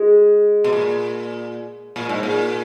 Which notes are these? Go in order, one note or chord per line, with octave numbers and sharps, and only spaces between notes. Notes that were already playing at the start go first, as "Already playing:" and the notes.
Already playing: G#3
B2
A#2
A#2
G#2
A#2